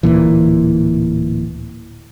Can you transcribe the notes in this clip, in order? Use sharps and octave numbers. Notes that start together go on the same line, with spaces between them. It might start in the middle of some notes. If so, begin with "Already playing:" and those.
D1 G1 A#2 E3